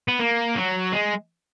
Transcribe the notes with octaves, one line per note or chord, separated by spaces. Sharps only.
B3
A#3
F#3
G#3